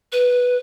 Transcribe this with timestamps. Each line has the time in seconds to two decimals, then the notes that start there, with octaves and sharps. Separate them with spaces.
0.12 B4